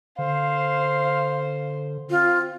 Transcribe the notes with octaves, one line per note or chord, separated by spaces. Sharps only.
D3 C5 F5
C4 F4